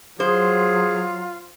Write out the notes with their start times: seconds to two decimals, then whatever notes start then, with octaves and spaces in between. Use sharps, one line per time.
0.20 F#3 F4 G#4 C5